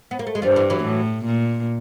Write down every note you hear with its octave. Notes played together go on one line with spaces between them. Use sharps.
B3
A#3
A3
G#3
G2 F3 G3
D3 E3
E3 F#3
A2
A#2